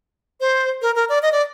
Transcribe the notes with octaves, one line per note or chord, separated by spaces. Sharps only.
C5
A#4
A#4
D5
D#5
D5